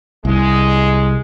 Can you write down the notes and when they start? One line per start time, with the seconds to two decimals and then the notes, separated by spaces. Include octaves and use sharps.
0.25 C2 G#3